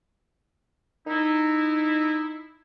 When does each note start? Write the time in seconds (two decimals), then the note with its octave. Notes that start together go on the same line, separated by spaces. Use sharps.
1.07 D#4 E4